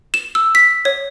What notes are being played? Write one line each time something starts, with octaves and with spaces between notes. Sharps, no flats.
E7
E6
B6
C#5